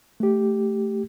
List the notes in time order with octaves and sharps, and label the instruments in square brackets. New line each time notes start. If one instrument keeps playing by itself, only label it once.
[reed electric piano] A3 G4